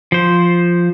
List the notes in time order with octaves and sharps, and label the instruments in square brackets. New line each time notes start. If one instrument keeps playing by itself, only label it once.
[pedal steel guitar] F3 C5